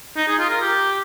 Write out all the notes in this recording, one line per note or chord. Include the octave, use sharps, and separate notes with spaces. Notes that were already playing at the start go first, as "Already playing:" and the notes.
D#4
G#4
F4
A#4
G4